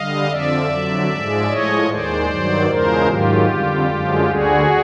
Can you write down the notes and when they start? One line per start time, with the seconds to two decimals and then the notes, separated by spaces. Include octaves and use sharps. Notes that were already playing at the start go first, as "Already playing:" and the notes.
Already playing: D3 G3 D#5 F5
0.29 F2 D3 F3 D5 E5
0.69 F2 D3 F#3
1.08 G#2 F3 G#3
1.47 A2 F3 G#3 C#5 D#5
1.87 D#2 D#3 G#3 C5 D5
2.27 G2 D#3 F#3
2.67 E2 C#3 F3 G#3 A#4 C5
3.06 G#2 D#3 F#3 F4 G4
3.46 F2 D3 G3
3.86 F#2 D3 F3 G#3
4.25 D2 D3 G3 F#4 G#4